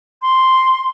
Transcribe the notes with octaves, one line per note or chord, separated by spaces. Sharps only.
C6